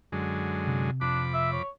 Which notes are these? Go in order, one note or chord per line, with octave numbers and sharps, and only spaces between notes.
F#2 D3 G#3
C3
F2 D4 B5 D6
E5
C#5